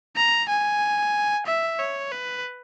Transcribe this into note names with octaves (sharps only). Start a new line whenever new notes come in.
A#5
G#5
E5
C#5
B4